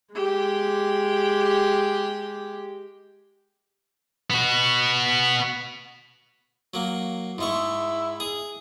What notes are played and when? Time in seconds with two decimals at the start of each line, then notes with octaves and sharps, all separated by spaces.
0.14 G#3 G4
4.30 B3 F#4
6.74 F#3 A#3
7.38 G#2 G#3 E4 C#6
8.20 G#4